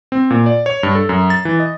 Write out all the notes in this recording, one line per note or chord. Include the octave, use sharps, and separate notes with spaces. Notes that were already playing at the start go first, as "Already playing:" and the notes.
C4
A#2
D5
C#5
G2
A4
F#2
A6
E3
D#5